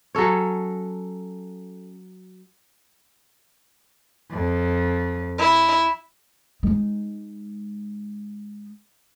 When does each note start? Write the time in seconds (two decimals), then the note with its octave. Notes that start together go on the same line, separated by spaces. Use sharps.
0.15 F#3 C#4 A4 C#5
4.31 F2
5.38 E4
6.63 G#3 D#4